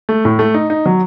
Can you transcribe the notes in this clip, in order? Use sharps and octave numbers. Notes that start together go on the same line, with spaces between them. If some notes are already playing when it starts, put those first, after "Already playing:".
A3
A2
A3
D#4
D#4
F#3